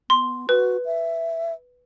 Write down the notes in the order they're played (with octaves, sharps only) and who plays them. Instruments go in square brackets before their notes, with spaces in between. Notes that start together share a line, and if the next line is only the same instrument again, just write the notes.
[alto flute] B3 [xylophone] C6
[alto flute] F#4 [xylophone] B4
[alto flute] E5